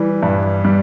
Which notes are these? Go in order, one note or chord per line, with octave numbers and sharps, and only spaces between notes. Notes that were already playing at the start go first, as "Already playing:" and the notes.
Already playing: E3 G3
G2
G3